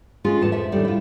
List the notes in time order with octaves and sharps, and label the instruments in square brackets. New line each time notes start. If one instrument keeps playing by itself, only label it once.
[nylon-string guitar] G#3 C#4 F4 G#4
E2 A2 A5
F2 E5
A2 D#3 G3 A3 D4
E4 F4